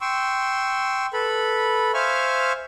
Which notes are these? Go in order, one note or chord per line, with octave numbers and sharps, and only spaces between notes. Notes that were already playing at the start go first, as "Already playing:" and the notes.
G5 C6 C#6 E6
A4 B4 B5
C5 E5 F5 G#5 C#6 F6